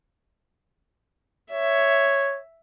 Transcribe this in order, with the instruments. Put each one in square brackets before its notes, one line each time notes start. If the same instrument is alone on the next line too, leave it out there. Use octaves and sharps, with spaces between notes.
[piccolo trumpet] C#5 [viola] E5